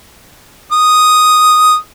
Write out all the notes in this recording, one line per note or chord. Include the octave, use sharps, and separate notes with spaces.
D#6